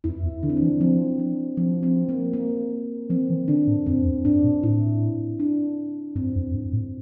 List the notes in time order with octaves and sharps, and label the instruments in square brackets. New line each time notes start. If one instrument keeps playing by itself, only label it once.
[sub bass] F2 [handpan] E4
[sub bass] E2
[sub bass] D3 [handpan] D4
[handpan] C4
D4
[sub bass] E3
[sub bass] F3 [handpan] C4
[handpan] D4
[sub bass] F3 [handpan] C4
[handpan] C4
A#3
A#3
[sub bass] F3 [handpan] C4
[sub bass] E3
[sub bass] D3 [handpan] D4
[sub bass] A2
[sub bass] F2 [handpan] C4
[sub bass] E2
[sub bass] G2 [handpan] D4
[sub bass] A#2
[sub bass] A2 [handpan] E4
[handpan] D4
[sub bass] G2 [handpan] C4
[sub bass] F2
G2
A2